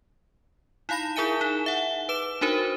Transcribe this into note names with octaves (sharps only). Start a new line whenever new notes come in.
D#4 E4 F5 B5 A#6
E4 G#4 A#4 E5 G#5 D#7
D#4
E5 F#5
B4 D6 E7
D4 D#4 F#4 A#4 C5